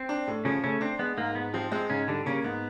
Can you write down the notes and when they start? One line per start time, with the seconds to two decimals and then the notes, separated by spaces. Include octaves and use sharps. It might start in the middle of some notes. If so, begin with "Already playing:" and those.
Already playing: C4
0.09 D4
0.27 A2
0.45 C#3 F3 C#4
0.64 C#3 A3 C#4
0.81 C4 D4
0.99 G#3 B3
1.17 G#2 A#3
1.35 G#2 B3
1.54 F3 C4
1.72 G#3 C4
1.90 G#2 C#3 C#4
2.08 D3 G3 D4
2.26 C#3 A#3 C#4
2.44 G#2 B3